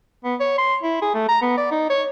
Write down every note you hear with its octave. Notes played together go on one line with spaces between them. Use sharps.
B3
C#5
C6
E4
G#4
A3
A#5
B3
D5
D#4
C#5